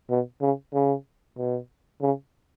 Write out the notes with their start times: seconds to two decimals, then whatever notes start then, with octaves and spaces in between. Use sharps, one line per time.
0.10 B2
0.42 C#3
0.73 C#3
1.38 B2
2.01 C#3